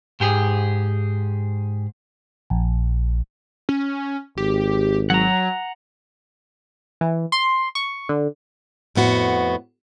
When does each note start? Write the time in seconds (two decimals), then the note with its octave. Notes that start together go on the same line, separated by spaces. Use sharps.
0.20 G#2 G4 G#4
2.50 A#1
3.69 C#4
4.37 G#1 G4
5.10 F#3 F#5 A#5
7.01 E3
7.32 C6
7.75 C#6
8.09 D3
8.95 F2 A2 B3 F#4